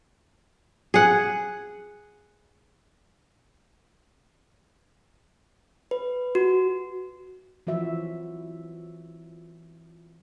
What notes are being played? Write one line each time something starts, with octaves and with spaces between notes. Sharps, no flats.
G#4 F#5
B4
F#4
E3 F3 F#4 E5